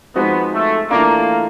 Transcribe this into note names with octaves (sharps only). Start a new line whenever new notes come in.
F3 G#3 B3 C4 D#4 F#4
A3
E3 A3 A#3 D4 F4